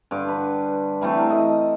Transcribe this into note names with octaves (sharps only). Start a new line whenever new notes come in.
G2 D3 D6
B4
E3 G3 A3 C4
A#4
A4 D#5